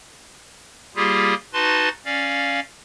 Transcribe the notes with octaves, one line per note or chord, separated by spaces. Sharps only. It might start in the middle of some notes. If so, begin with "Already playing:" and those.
G3 A#3 F4 G4 G#4
D#4 F#4 B4 A5 C6 A6
C#4 D5 F5